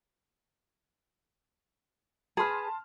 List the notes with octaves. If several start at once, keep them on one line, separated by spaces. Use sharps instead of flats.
G#4 B4 A5 C6 F6